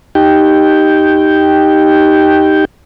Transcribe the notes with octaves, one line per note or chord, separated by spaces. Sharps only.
D#4 G4 G5